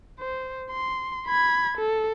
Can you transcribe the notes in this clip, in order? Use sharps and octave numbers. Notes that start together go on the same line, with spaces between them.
C5
C6
B5 G#6
A4